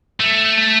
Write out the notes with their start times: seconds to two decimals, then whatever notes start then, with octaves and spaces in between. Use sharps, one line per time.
0.20 A3